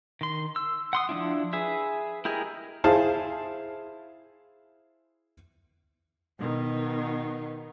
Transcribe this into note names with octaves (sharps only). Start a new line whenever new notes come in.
D#3 C6
E6
F#5 C6 D#6
F3 B3 D4 E4
G#4 B4 E5
E4 G4 G#4 A#4 D#5
E4 G#4 C5 F5 A5
B2 D#3 B3